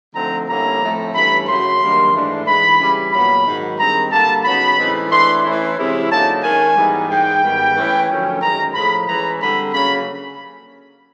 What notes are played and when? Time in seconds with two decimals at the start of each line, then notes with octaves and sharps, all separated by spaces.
0.15 D3 F3 A3 C4 D#4 A#5
0.47 D3 G3 A#3 C#4 E4 A#5
0.80 A2 F3 A3 C4 E4
1.14 G2 E3 A3 C#4 B5
1.47 F#2 C#3 F#3 C6
1.80 F#2 D#3 G3 A#3 D4
2.13 G#2 E3 A3 D4
2.46 G#2 E3 G#3 B5
2.79 C#3 E3 G3
3.12 A#2 F#3 B3 B5
3.45 G#2 D#3 F#3
3.78 G2 D#3 G#3 C4 A#5
4.11 D3 G3 A#3 A5
4.44 C#3 F#3 B3 D#4 B5
4.78 A2 E3 G#3 C4 D#4
5.10 E3 A3 D4 C6
5.44 E3 A3 C#4 E4
5.77 C3 E3 G#3 C#4 E4
6.10 D3 F#3 A#3 D#4 A5
6.43 D#3 G#3 C#4 G#5
6.76 G#2 E3 G3 B3 D#4
7.09 G#2 E3 G#3 G5
7.42 G#2 D#3 G3 B3
7.76 E3 A3 C#4 E4
8.08 F#2 D3 F3 A3 C#4
8.41 F#2 D#3 G#3 A#5
8.75 A2 F3 G#3 B5
9.07 E3 G#3 C#4 A#5
9.40 D3 G3 C4 B5
9.73 C#3 F#3 A#3 C#4 B5